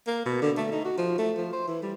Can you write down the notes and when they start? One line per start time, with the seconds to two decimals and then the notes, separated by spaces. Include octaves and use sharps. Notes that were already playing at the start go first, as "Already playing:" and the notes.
0.07 A#3
0.25 B2
0.41 D3
0.57 A3
0.72 D#4
0.84 F#4
0.98 F3
1.18 A3
1.36 F3
1.53 C5
1.67 E3
1.82 G3